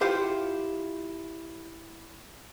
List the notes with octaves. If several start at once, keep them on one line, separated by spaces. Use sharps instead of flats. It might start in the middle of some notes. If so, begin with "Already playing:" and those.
E4 F4 G4 C5 F5 F#5